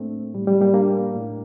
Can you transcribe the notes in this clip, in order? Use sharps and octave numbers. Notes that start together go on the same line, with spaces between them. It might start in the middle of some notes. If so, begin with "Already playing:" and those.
Already playing: A2 A3 A#3 C4 D4
A2 G3
G3
G3 A#3
A#3 D4
A2